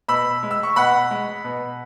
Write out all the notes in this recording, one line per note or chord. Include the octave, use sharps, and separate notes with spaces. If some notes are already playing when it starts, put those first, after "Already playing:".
B2 B5 E6
G#3
E6
C#6
B2 F#5 B5
G#3
B2